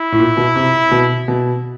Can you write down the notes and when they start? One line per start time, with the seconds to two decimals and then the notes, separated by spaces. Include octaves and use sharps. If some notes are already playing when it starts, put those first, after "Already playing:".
Already playing: E4
0.12 A2
0.19 A#2
0.37 B2
0.56 C3
0.91 B2
1.28 B2